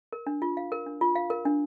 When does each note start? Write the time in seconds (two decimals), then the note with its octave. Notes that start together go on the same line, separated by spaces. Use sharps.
0.13 A#4
0.26 D4
0.42 F4
0.57 F5
0.72 A#4
0.86 D4
1.01 F4
1.16 F5
1.30 A#4
1.45 D4